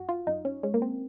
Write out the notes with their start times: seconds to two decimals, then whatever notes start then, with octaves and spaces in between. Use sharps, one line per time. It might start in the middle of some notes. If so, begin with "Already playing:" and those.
Already playing: F#2 F#4
0.09 F4
0.27 F#2 D#4
0.45 C#4
0.63 G#3 C#4
0.74 A#3
0.82 C4